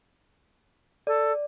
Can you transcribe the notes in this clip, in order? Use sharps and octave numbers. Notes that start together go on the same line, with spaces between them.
A4 D5